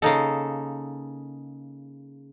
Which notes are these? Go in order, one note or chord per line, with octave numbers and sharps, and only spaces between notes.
C#3 A#3 D#4 A4